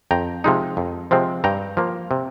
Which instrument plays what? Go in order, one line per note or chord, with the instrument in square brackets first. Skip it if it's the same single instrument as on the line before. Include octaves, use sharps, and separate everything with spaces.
[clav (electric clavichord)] F2 G5 A#5
C3 F3 G#3 D#4
F2
C3 F3 G#3 C4
G2 G5 A#5
F3 A#3
C3